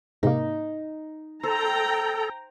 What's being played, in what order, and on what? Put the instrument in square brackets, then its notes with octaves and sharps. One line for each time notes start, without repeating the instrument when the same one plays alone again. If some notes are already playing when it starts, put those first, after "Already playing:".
[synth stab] G#2 C3 A#3 [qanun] D#4
[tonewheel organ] A4 [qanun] C5 [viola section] G5 A#5